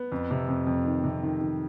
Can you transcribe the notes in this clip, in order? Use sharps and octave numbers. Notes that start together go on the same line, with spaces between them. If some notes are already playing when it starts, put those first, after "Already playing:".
Already playing: B3
F2
C3
F2
F2
D#3
C3
D#3
D#3